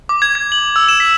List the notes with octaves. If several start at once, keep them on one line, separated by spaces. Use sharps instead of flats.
D6
G#6
G#6
F#7
E6
E7
B6